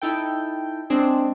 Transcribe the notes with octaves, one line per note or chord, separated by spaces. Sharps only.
D#4 E4 A4 G5
G#3 C4 D4 G#4